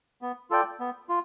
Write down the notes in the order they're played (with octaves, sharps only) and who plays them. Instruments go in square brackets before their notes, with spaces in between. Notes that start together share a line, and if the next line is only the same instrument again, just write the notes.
[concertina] B3
F4 A4 D5 G5
B3
F4